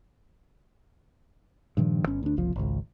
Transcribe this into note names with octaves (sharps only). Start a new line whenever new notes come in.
G2 A#2 D#3 F3
G1 C#4
D2 D4
F#1 C2 F3
G#1 C#2